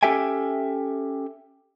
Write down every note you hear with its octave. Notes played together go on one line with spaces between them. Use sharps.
C#4 G4 A4 E5 G5 G#5